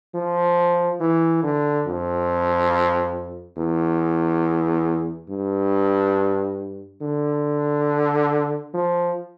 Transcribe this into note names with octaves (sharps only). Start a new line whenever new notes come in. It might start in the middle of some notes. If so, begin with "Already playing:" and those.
F3
E3
D3
F2
E2
G2
D3
F3